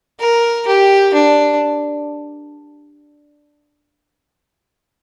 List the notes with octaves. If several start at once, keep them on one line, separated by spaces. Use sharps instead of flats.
A#4
G4
D4